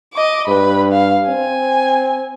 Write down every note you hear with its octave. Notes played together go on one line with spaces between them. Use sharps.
D#5 D6
G2 B4 B5
F5
C4 G#5